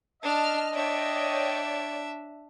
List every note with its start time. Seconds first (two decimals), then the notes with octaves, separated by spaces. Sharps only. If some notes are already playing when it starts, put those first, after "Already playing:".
0.23 D4 D#5 A5 F6
0.74 D4 C#5 D5 E5 G5